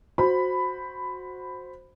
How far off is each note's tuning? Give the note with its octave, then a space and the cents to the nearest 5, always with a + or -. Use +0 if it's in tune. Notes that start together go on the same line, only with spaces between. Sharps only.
F#4 -15 C5 +0 B5 +10